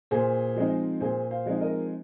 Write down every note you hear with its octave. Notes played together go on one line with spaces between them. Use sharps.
A#2 G#4 C5
F3 G#3 C4 D#4
A#2 G#4 C5
C5 F5
F3 G#3 C4 D#4
A#4 D#5